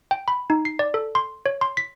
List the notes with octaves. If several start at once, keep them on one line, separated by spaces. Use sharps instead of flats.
G5
B5
D#4
C7
D5
A4
C6
C#5
C6
B6